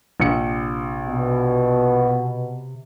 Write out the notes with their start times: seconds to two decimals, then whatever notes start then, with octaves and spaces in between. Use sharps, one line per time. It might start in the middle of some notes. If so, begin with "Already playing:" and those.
0.20 A#1 C3 C#7
1.08 B2